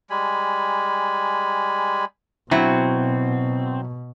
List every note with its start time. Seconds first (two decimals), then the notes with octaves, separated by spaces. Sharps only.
0.10 G3 G#3 G#5 B5
2.51 B2 F#3 C4 E4 F#4